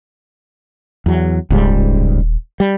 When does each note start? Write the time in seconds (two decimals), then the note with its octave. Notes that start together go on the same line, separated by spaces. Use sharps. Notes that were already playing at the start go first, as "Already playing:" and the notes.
1.06 E2 F#3
1.50 D#1 C#2 G#2 G3
2.60 G3